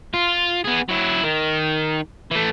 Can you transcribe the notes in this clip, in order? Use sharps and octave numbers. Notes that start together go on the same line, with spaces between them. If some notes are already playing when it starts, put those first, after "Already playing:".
F4
B3 G#4
F#3 E4
D#3
E3 A3